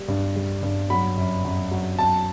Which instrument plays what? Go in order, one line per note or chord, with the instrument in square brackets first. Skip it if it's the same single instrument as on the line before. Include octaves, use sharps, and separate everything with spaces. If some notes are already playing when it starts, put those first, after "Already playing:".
Already playing: [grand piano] G3
G2
G3
G2
F#3 B5
F#2
F#2
F#3
F#3 A5